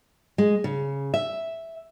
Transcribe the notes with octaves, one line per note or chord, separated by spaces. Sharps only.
G#3
C#3
E5